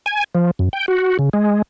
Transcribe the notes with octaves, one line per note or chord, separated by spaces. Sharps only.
G#5
F3
F#2
G5
F#4
C#3
G#3